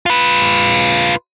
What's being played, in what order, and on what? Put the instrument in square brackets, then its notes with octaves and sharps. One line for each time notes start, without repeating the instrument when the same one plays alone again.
[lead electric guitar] F4 B4